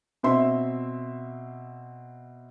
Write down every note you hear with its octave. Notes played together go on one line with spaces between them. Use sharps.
B2 C4 E5 C6